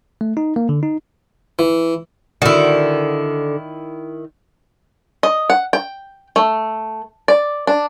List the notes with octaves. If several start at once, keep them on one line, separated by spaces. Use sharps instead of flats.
A3
D#4
A#3
D3
D#4
E3
D3 D#3 E4 F#4 D5
D#5
F#5
G5
A3
D5
D4